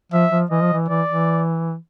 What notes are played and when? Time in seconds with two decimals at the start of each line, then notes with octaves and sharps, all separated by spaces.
0.12 F3 E5
0.31 F3
0.50 E3 D#5
0.62 F3
0.73 E3
0.88 E3 D5
1.08 E3